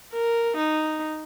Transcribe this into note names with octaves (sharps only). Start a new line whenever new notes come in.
A#4
D#4